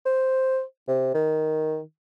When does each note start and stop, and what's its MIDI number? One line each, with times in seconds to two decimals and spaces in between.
0.05 0.62 72
0.88 1.13 48
1.14 1.80 51